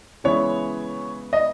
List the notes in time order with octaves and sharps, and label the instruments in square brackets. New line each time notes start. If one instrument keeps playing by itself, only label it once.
[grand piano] C#3 E3 G#3 B3 E4 [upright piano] C#5
[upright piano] D#5